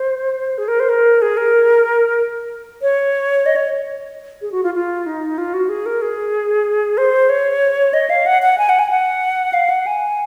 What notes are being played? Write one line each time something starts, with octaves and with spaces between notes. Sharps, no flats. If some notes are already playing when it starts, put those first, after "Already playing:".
Already playing: C5
G#4
A#4
C5
A#4
G#4
A#4
C#5
D#5
C#5
G#4
F#4
F4
F4
D#4
F4
F#4
G#4
A#4
G#4
C5
C#5
D#5
F5
F#5
F#5
G#5
F#5
G#5
F#5
F5
F#5
G#5